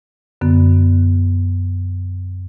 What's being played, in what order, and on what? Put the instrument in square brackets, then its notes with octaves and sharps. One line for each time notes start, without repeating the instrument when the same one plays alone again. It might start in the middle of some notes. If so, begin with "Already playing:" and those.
[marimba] F#2 D3 B3